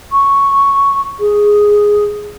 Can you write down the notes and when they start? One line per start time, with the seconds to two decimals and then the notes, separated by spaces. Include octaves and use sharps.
0.12 C#6
1.20 G#4